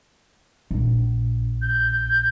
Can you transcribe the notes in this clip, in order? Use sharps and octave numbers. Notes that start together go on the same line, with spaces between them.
A#1
G6